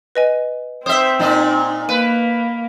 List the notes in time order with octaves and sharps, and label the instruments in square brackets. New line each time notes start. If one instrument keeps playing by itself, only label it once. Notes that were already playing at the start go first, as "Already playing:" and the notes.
[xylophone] B4 D#5 G#5
[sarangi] C4 [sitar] C5 E5 [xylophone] D#6
[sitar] A#2 D4 D#4
[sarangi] A#3 [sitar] B4 [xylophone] D#7